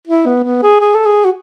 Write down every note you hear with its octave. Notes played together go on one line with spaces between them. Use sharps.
E4
B3
B3
G#4
G#4
A4
G#4
F#4